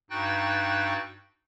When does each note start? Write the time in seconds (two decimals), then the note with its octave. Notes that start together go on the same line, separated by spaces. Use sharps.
0.10 G2 D#4 F#4 G5 F#6 A6